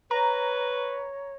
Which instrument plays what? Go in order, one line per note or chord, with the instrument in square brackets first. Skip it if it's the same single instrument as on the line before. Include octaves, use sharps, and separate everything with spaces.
[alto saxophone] B4 [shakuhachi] C#5 [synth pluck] A#5